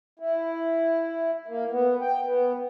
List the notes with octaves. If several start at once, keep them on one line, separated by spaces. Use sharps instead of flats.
E4
A#3
B3
G5
B3